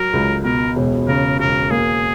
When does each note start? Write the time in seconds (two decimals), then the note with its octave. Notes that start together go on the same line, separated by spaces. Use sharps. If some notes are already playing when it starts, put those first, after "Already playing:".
Already playing: F#3 A#4
0.13 C#2
0.44 B2 A#4
0.76 E1
1.08 C#3 A#4
1.39 E1 A#4
1.71 A#3 G#4